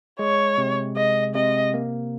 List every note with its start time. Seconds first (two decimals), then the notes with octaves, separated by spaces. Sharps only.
0.19 G#3 C#5
0.58 C3
0.96 G#3 D#5
1.35 C3 D#5
1.74 A#3